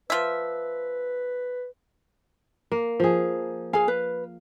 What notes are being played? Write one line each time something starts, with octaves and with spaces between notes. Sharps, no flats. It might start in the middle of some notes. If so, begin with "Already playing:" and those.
F3 B4 E5
A#3
F3 G#4
G#4 F5 G#5
B4